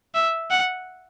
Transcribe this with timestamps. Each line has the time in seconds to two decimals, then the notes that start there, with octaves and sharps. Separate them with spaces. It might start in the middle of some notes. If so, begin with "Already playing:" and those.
0.14 E5
0.51 F#5